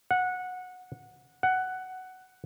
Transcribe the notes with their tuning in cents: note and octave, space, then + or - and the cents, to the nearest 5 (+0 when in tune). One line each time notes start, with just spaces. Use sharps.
F#5 -15
F#5 +10